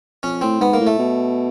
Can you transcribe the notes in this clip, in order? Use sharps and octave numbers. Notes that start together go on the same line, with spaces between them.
F2 C#4
A2 C4
G#2 B3
A#3
A2
A3
B2